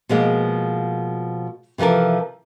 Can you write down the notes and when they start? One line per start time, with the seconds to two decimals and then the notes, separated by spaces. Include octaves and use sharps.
0.09 B2 F3 G#3 A#3
1.78 C3 E3 F3 A4 A#4